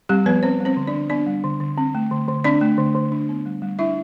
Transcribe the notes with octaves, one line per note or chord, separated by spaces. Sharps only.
G3 C4 G4
F3 B3 B4
B3 C4 C5
G3
C4 C5
D3
D4 D5
D3
B3 D4 D5
G3
D3
D3
C4
A3
D3
D3
C4 D4 D5
A3
D3
D3
D4
B3
G3
G3
D4 E4 E5